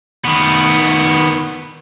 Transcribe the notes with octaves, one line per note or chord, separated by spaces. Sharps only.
D#3 B3